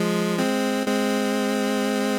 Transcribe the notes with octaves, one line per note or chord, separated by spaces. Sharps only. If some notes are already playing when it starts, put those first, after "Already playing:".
Already playing: F3 G#3
G#3 C4
G#3 C4